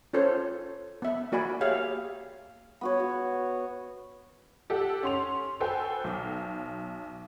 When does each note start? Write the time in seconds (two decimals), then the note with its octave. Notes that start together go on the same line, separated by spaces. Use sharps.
0.13 C#4 F4 A4 C5 C#5
1.02 B3 E5
1.32 A#3 F#4 D5 G#5 B5
1.61 G4 G#4 C#5 E5 F5
2.81 B3 F#4 C#5
3.00 F#4
4.70 G4 A4 F#5
5.03 C#4 C6 F7
5.60 F#4 A4 B4 C5 G5 G#5
6.04 B1